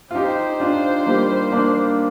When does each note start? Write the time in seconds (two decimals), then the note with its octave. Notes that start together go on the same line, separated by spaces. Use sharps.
0.11 F4
0.14 D#4 G4 C5
0.60 D4 F4
1.06 G3 A#3
1.52 A#3 D4